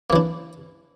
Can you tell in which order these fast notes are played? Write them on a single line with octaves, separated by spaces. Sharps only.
A#3 E3 D4